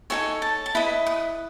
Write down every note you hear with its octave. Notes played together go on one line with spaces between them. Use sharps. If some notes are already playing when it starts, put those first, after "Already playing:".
D#4 F#4 A4 C#5 G#5
A5
A5
E4 B4 D#5 B5
D#6